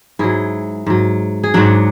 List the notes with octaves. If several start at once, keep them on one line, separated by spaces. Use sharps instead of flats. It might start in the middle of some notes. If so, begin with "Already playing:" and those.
G#2 F#3 E4 G#4
G#2 F#3
G#4
G#2 F#3 D4 F#4